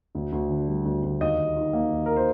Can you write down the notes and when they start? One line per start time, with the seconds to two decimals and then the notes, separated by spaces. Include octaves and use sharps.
0.15 D2
0.32 D2
0.50 D3
0.68 G3
0.85 D2
1.03 D2
1.21 D#2 D#5
1.38 D#2
1.56 D#3
1.73 A#3
1.92 D#2
2.06 A#4
2.16 C5